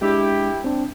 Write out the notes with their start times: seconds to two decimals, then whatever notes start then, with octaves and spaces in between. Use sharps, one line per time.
0.02 G#3 D4 E4 G4
0.64 C4 D4